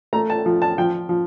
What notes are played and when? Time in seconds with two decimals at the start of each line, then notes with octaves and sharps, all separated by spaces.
0.13 A3 A#5
0.30 A5
0.46 F3
0.62 A5
0.78 F3 G5
1.09 F3